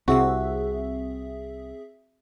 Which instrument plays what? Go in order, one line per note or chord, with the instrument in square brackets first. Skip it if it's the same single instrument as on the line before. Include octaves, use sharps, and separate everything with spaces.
[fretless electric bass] C2 C3 [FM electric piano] C4 G#4 E5 [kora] F#4